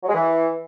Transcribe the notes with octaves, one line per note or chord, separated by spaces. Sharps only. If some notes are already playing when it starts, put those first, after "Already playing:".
F#3
G#3
E3